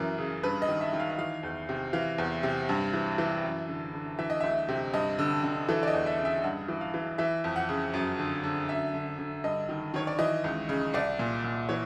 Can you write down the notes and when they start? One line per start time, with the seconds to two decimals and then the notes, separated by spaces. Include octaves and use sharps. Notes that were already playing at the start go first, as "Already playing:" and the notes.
Already playing: F#2 E3 A#4
0.18 C#3
0.43 G2 B4
0.62 D#5
0.68 D#3
0.81 E5
0.93 D#3
1.00 F5
1.18 E3 F5
1.43 E2
1.69 C3
1.93 E3 F5
2.18 E2
2.43 C3
2.69 G2
2.93 E3
3.18 E3
3.43 F#2
3.69 D3
3.94 D3
4.19 E3 E5
4.30 D#5
4.41 D2 E5
4.69 C3
4.94 G2 D#5
5.19 D3
5.44 D3
5.69 E3 A4
5.83 D5
5.87 D#5
5.94 E2
6.06 E5
6.18 C#3
6.25 E5
6.44 G2 F#5
6.68 E3
6.81 F5
6.94 E3
7.18 E3 E5
7.44 F2
7.56 F#5
7.69 C#3
7.94 F#2
8.19 D3
8.43 D3
8.69 F#2 E5
8.94 D3
9.19 D3
9.44 G2 D#5
9.69 D#3
9.94 D#3 C#5
10.07 D5
10.19 E3 D#5
10.44 C#2
10.69 C#3
10.94 C2 D5
11.19 A#2
11.44 A#2
11.69 E3 C#5